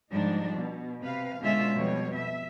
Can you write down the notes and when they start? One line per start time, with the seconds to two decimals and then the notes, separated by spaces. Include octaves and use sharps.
0.12 G#2 F3 G3 D4 D#4
0.58 B2
1.01 C3 B4 F5
1.41 B2 D3 G#3 C#4 F4 E5
1.75 F2 B2 G3 C#5
2.15 E5